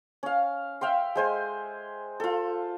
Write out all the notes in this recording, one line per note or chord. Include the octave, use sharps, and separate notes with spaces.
C#4 F5
E5 F5 G5 C6
G#3 C5 G#5
F4 A4